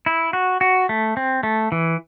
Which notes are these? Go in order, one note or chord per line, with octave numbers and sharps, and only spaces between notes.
E4
F#4
F#4
A3
C4
A3
E3